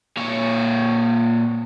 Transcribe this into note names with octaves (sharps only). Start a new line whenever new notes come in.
A#2 C#5